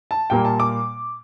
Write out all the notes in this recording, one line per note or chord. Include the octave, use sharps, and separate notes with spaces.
A5
A#2 G3 A#3 G5
A5
D6